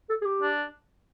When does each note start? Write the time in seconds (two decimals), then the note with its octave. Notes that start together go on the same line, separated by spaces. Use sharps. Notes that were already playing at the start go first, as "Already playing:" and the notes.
0.09 A4
0.21 G#4
0.25 G4
0.42 D4